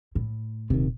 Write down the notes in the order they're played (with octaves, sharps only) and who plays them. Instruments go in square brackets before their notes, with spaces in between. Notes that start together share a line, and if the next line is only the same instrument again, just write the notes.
[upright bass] A2
[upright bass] D#1 [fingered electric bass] C3 D#3